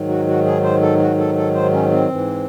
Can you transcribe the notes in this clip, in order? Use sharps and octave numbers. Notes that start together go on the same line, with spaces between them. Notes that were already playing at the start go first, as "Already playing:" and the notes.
Already playing: G#2 D#3 F#3
F#4
F#4
G#4
C5
A4
F#4
A4
A4
C5
C#4
C4
G#2 E3